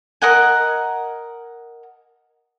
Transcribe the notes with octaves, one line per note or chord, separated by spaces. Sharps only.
A#4 D#5 F#5 G#5